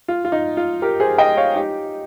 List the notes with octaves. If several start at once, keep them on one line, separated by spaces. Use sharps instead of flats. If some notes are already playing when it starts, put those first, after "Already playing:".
F4
F4
D#4
F4
G4 A#4
G#4 C5
D#5 G5
C#5 F5
D#4 G4